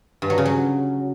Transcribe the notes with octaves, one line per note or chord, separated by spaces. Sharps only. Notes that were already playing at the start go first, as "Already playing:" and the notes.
G2
F#3
C#3
F#3